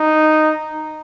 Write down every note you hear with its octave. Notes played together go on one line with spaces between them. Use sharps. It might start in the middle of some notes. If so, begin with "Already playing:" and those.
Already playing: D#4